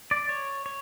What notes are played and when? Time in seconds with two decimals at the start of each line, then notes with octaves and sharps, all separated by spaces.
0.11 D5
0.29 C#5
0.66 C#5